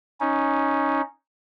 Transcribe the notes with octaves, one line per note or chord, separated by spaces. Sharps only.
C#4 D#4